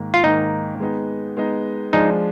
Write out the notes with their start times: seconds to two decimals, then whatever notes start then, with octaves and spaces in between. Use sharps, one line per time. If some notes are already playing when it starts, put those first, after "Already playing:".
Already playing: G#2 D#3 A#3
0.14 F4
0.24 G#2 D#3 A#3 D#4
0.80 G#3 B3 D#4
1.37 G#3 B3 D#4
1.93 F3 G#3 D4 D#4 G#4